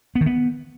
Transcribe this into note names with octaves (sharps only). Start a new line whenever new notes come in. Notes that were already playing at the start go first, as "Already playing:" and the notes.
B3
D#3
B3